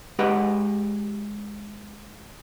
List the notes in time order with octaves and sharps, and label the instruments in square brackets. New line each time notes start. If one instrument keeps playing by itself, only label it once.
[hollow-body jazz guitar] G#3 G4 B4 D#5 F#5